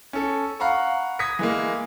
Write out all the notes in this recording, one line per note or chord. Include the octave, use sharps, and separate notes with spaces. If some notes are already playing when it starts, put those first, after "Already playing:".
C#4 A4
F5 F#5 A#5 B5 C#6
D#6 G#6 A#6 B6 C#7
E3 G#3 A#3